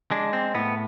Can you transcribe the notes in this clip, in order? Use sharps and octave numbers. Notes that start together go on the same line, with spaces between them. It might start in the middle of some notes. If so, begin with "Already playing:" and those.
G#3 D4
C4
A2 B3